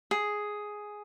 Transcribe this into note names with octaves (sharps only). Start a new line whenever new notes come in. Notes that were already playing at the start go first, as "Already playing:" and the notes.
G#4